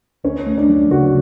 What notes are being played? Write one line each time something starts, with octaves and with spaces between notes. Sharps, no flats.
D2 C#4
A3
D4
F#3
C#3 F#4